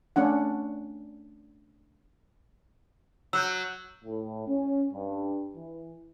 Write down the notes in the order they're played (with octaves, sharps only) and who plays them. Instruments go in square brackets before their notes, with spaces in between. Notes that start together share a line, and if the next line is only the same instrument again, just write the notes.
[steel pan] A3 C#4 D4 F#5
[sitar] F#3 [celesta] E6 F#6 G6
[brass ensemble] A2
C#4
G2
E3